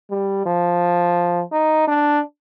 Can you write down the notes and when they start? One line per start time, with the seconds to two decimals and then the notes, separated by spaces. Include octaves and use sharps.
0.11 G3
0.46 F3
1.52 D#4
1.88 D4